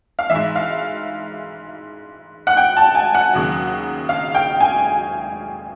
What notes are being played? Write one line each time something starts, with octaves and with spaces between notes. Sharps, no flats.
F5
G#2 E3 E5
F5
F#5
G5
A5
G#5
F#5
D#2 C#3 F#3
F5
G5
G#5